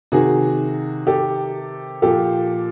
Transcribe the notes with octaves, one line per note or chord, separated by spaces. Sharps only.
C3 D#3 F#4 G#4
G4 A4
A#2 F3 G4 A4